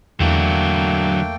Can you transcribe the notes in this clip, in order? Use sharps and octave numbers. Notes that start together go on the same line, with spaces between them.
E2 D3 F#3 A3 A#3 G5